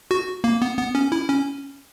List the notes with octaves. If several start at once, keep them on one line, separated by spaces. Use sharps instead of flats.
F#4
A#3
B3
B3
C#4
E4
C#4